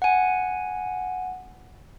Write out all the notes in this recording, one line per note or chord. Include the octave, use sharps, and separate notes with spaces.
F#5 G#5